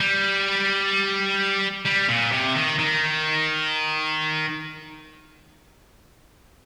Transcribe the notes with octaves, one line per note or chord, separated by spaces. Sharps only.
G3
G3
A#2
C3
D#3
D#3